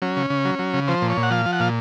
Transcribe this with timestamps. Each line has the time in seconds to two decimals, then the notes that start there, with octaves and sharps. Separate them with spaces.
0.02 F#3 C#4
0.17 C#3
0.30 C#3
0.45 F#3
0.59 F#3
0.74 C#3
0.88 F3 C5
1.02 A#2
1.10 C#5
1.17 A#2
1.23 F#5
1.31 F3 F5
1.46 F3
1.53 F#5
1.60 A#2 F5